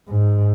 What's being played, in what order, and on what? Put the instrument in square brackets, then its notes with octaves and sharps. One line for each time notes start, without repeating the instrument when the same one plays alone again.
[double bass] G#2